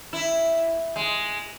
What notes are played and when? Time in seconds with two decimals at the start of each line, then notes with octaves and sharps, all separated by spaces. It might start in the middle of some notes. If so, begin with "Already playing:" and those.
0.13 E4
0.96 G#3